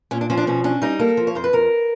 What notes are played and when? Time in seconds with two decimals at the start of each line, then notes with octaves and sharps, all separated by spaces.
0.11 A#2 C#4
0.21 D4
0.30 F3 C#4
0.37 D4
0.47 B2 C#4
0.64 C#4 D4
0.82 G3 D#4
0.99 A#3 A4
1.17 F3
1.27 C#5
1.35 F2 C5
1.44 B4
1.53 F2 A#4